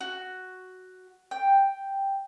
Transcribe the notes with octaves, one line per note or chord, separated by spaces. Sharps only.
F#4
G5